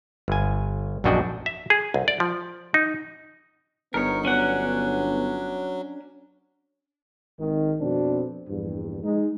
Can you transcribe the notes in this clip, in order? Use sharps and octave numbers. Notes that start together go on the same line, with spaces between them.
G1 G#5
A#1 F#2 D4 F#4 D#5 G5
E5
G#4
C2
D5
F3
D#4
G1 B3 D#4 A#4 C#5
F#3 C#4 D4 F#5
G#1 D#3
F2 B2 C4 D4
A#1 E2 G2
G#3 D#4